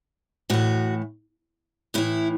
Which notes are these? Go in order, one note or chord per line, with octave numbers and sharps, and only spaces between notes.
A2 E3 F#4
A2 E3 E4